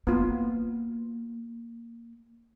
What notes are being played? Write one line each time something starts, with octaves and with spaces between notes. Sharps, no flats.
A#3 B3 F4